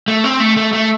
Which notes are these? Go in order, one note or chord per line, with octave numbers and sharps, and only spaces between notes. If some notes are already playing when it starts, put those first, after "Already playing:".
A3
C4
A3
A3
A3